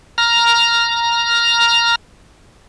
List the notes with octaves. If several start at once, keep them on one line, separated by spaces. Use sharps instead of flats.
A#5 F6